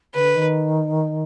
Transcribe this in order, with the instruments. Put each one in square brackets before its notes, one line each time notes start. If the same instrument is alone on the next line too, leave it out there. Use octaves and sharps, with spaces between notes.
[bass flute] D3 [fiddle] B4
[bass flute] D#3